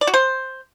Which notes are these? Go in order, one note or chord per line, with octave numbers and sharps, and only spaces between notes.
D5
F#4
C5